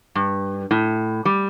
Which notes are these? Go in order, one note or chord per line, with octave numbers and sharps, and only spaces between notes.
G2
A2
G3